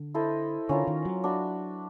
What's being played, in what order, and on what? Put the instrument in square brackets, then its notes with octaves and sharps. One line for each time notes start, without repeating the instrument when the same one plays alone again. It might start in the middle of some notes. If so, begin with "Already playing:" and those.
Already playing: [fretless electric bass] D3
[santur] E4 A4 C5 D#5
[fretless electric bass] D3 [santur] C#4 F4 A#4
[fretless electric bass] D#3
F#3
[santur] D4 F#4 B4 E5